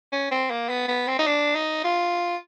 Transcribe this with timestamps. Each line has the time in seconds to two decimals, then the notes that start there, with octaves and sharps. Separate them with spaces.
0.13 C#4
0.31 C4
0.50 A#3
0.69 B3
0.88 B3
1.08 C4
1.19 D#4
1.27 D4
1.55 D#4
1.84 F4